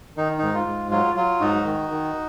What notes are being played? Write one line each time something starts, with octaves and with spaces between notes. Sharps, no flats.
D#3 D#4
G#2 D#4
F4
G#2
F#3 F4
F#3 F4
G#2 D#4 F#4
D#3
D#3